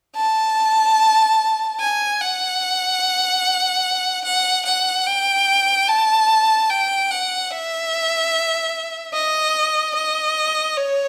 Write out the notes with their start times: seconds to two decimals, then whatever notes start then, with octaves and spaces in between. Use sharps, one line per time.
0.16 A5
1.80 G#5
2.21 F#5
4.24 F#5
4.65 F#5
5.07 G5
5.88 A5
6.70 G5
7.11 F#5
7.51 E5
9.14 D#5
9.95 D#5
10.77 C#5